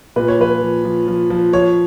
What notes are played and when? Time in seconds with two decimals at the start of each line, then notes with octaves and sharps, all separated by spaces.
0.16 A#2 B4
0.28 C#5
0.39 F3 B4
0.61 F3
0.85 F3
1.08 F3
1.30 F3
1.53 F3 C#5